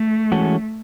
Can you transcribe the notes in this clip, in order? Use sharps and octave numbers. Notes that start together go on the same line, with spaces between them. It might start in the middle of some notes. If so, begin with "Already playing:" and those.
Already playing: A3
E3 G#3 C#4 F#4 A4